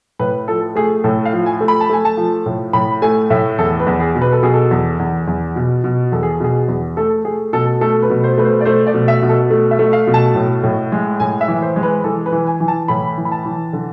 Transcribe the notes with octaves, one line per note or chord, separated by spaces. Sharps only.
A2 B4
F3 A4
A3 G#4
A2 A4
F5
F3
G#5
A3
B5
A5
A3 G#5
A5
F3
A2
A2 B5
A3 G#5
A2 E5
E2 A4
B4
E2
G#4
B2
B4
A4
B2 G#4
A4
E2
E2
E2
B2
B2
E2 A4
G#4
B2 G#4
E2
A3 A4
A3 G#4
B2 A4
A3 A4
B4
B2
C5
A3 B4
C5
D5
A3 C5
D5
B2
E5
B2
A4
A3
E5
A3
F5
B2
A5
A2
A2
G#3
A2 G#5
E5
E3
C5
G#3
B4
E3 A4
B4
E3
G#5
E3
A5
A2 B5
E3
B5
A5
E3
D3